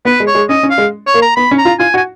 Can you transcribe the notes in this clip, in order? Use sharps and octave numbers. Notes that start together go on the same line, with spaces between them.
B3 B4
G#3
C#5
G#3
C#4 D#5
C#4
F5
G#3
C#5
A#3
A#5
B3 B5
C#4
A#5
F4
F4 G#5
F#4
G#5